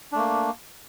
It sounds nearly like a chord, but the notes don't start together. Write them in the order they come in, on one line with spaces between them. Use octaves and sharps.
D4 A3 A#3